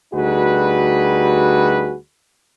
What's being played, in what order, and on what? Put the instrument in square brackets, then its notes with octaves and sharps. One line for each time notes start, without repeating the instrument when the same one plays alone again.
[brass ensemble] D2 G3 D#4 F#4 G#4 B4